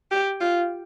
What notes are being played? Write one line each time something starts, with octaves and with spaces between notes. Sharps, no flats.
G4
F4